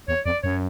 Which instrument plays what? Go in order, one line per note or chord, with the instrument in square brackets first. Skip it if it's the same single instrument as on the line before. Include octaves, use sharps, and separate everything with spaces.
[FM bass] E2 [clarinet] C#5
[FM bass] F2 [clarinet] D5
[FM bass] F#2 [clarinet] C#5